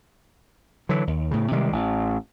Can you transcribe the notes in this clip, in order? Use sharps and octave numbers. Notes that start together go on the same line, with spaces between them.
D3 E3 F#3
D#2
A2 C#3
C3 D#3 G3 G#3
A1